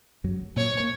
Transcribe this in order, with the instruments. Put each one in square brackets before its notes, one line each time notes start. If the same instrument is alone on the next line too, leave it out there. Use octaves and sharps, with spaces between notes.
[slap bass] F#2 F#3
[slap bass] A#2 A#3 [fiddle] C#5
[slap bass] A#3